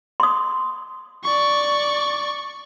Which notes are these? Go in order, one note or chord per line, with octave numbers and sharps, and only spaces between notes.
C6 D#6
D5 C#6